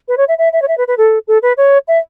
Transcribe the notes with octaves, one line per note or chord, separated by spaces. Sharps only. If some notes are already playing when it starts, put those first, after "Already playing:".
B4
C#5
E5
E5
E5
C#5
E5
B4
B4
A4
A4
B4
C#5
E5